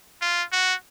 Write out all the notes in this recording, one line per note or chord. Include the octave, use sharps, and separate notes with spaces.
F4
F#4